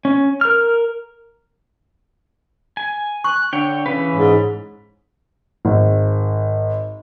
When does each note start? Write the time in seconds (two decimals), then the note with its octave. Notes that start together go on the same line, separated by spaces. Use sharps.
0.05 C#4
0.41 A#4 F6
2.77 G#5
3.24 C#6 F#6
3.53 D3 C#5 G5
3.86 C#3 E3 C#4 B4
4.15 G#2
5.65 G#1